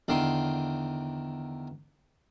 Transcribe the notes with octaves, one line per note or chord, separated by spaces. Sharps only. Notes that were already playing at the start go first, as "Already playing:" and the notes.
E2 D3 D#3 C6